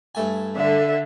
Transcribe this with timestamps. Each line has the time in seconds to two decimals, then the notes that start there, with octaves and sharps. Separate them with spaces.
0.15 G2 A3 G#5
0.56 D3 E5